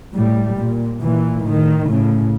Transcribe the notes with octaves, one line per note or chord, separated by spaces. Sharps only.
A2 G3
A#2
A#2 E3
A2 D#3
A2 C#3